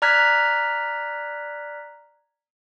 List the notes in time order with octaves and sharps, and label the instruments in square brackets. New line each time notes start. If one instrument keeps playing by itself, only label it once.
[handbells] D5 A#5 F6 F#6 G#6 B6